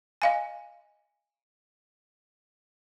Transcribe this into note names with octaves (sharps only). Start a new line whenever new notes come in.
D#5 F5 G#5